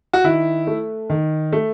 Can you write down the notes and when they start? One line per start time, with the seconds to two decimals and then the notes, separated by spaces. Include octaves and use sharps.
0.13 F#4
0.24 D#3 E4
0.67 A3
1.10 D#3
1.53 A3